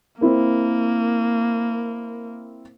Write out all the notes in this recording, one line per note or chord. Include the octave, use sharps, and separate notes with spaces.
A#3 C4 E4 A#4